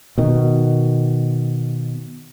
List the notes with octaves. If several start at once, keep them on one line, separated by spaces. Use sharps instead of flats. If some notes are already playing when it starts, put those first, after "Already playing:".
B2 D#3